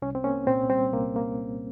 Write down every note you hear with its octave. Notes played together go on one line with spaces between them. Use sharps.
C2 C#4
C4
A#3 C#4
A#2 C4
G3 C4
C2 A#3
A#3